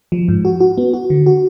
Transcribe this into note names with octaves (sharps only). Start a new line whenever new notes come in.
F3
G#2
F#4
F#4
B3
F#4
D3
F#4